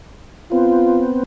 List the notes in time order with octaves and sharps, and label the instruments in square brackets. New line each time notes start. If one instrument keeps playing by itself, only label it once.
[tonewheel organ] B3 C4 [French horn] F4